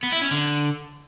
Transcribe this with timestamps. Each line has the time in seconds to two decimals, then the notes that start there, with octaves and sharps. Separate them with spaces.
0.03 B3
0.13 E4
0.22 C#4
0.31 D3